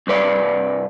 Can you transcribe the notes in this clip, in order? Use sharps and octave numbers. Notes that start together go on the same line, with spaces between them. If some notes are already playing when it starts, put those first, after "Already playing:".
C2 G2 B4 D5